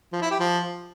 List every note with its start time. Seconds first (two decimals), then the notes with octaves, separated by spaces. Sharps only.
0.13 F3
0.22 E4
0.31 G4
0.40 F3